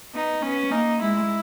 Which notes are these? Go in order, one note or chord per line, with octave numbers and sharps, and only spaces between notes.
B3 D#4
B3 C#4
A#3 D#4
G#3 E4